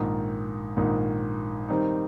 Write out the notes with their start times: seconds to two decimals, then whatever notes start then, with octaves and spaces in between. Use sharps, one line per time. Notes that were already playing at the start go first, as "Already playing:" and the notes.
Already playing: A#1 G#2 D#3
0.77 A#1 G#2 D#3
1.68 D#3 G3 C4 D#4